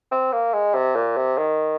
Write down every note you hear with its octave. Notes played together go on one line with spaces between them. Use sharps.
C4
A#3
G#3
C3
A#2
C3
D#3